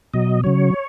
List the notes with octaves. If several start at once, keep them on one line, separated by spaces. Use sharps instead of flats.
B2 F#3 D#5
C#3 F#3 C#5